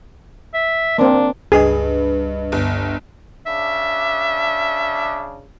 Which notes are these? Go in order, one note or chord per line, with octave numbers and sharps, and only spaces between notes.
E5
A#3 C4 D4
C#2 G2 G#4 B4 D#5
G1
C#3 D4 E5